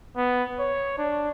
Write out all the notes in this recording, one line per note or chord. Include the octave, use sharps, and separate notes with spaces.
B3
C#5
D4